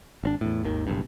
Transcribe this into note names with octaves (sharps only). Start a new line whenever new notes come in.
G#1 C4 D4
E2 A2
G#1 D#2 D#3
F#1 B1 G2